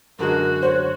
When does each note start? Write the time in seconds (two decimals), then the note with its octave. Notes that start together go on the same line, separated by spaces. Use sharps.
0.19 F#2 D3 G#3 F#4 A#4
0.63 C5 C#5